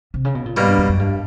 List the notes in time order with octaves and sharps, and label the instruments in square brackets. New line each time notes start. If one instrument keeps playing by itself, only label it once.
[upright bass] C3
C#3
B2
A#2
[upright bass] G#2 [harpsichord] B2 G3 A#3
[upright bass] G2
F2
F#2
G2